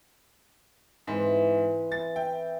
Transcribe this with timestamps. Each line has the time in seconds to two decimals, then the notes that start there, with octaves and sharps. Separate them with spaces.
1.07 G#2 E3 C4
1.92 A6
2.16 E5 G5